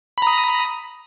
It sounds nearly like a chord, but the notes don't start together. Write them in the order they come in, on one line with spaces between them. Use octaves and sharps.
B5 A#5 D#6